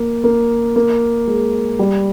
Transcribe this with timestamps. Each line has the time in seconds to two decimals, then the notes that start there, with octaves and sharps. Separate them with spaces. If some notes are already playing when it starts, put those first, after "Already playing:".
Already playing: A#3
0.24 A#3
0.76 A#3
1.27 G#3
1.79 G3